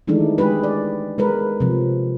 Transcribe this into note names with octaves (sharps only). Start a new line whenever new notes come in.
D#3 E3 G#3 A3 D4 D#4
G#3 G4 G#4 B4
D5
G#3 A#4 B4
C3 F3